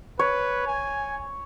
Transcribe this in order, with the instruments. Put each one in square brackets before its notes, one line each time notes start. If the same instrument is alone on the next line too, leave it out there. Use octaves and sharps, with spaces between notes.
[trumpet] B4 [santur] C#5
[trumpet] G#5